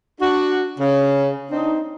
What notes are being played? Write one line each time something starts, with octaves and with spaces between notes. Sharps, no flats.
D4 F#4
C#3
C4 D4 D#4